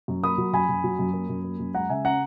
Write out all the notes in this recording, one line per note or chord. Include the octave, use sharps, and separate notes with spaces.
F#2
A#3 B5 D#6
F#3
F#2 G#5 B5
F#2
F#3
F#2
A#3
F#2
A#3
F#2
G#3 F#5 A#5
C#3 E5 G#5
C#4 F#5 A#5